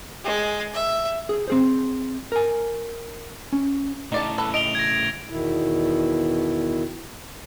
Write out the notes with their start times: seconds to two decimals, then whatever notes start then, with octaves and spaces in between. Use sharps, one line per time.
0.24 G#3
0.74 E5
1.29 G#4
1.48 C4 G#4 C5
2.32 A#4 G#5
3.52 C#4
4.12 A2 C#3 D#4 D5 A5
4.38 A4 B4
4.54 D#5 D7 F7 G7
4.75 G#6 A#6
5.30 E2 B2 D#3 E4